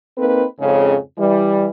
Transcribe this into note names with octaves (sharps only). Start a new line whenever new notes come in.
A#3 C4 D#4 A4 B4
F2 G#2 C#3
E3 G3